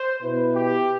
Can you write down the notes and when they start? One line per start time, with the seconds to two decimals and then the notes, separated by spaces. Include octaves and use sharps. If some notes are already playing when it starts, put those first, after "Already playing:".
Already playing: C5
0.21 B2 B3 E4 B4
0.55 G4